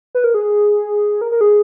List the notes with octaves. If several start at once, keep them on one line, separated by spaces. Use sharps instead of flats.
B4
A#4
G#4
A#4
A#4
G#4